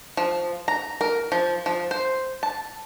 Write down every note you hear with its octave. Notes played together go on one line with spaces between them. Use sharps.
F3
A#5
A#4
F3
F3
C5
A5